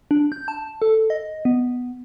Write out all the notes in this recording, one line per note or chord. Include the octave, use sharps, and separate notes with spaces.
D4
G6
A5
A4
D#5
B3